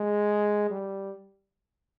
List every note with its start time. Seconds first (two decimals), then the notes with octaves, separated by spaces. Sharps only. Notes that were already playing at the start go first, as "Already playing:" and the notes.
Already playing: G#3
0.71 G3